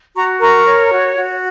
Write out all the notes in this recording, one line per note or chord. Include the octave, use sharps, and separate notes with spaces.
F#4 A#5 C#6
A#4 A#5 C#6
C#5
F#4
F#4